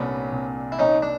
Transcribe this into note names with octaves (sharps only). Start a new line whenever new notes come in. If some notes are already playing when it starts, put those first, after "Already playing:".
Already playing: C2 A#2 B3 C#4 D4
C2
E4
A#3 C#4 D#4
D4